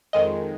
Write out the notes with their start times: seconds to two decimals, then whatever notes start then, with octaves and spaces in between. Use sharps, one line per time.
0.13 F2 D#3 G#3 D#5